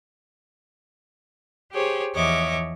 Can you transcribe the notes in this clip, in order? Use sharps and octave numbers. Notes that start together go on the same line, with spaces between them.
G4 G#4 C5 C#5
E2 F3 C#5 D#5 E5 D6